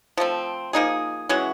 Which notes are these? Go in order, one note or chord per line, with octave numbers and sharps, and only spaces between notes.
F3 A3 C4
F3 A#3 D#4 G#4
E3 G#3 C#4 F#4